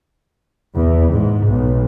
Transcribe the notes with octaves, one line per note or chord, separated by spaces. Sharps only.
E2
G#2
B1